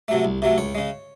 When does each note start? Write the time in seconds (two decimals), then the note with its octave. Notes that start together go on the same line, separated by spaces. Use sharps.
0.08 C3 F#3 A3
0.25 C2
0.42 C3 F#3 A3
0.58 C#2 C#5
0.75 C#3 G#3